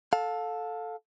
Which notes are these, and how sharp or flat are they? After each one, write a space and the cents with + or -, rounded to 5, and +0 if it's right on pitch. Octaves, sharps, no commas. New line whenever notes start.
A4 +0 F5 +30